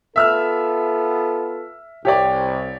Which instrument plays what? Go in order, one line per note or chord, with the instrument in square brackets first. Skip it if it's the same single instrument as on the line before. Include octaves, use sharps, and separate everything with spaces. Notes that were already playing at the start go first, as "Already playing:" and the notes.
[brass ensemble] B3 F4 A4 [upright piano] E5 E6 F6
[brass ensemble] C2 [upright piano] G4 C#5 D5